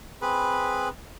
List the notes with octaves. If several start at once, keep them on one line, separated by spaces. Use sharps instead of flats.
C4 G#4 B4 B5